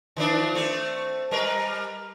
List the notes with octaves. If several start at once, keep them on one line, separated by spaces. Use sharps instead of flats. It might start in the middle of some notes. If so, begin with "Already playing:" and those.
D#3 F3 D4
A3 C4
G3 A#4 B4